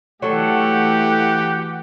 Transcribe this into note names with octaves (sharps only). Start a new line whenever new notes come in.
E3 F#3 A3 G4 A4 F#5